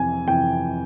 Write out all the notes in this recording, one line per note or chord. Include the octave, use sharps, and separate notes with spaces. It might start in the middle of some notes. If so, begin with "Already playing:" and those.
Already playing: F2 C3 E3 G#5
F2 C3 E3 G5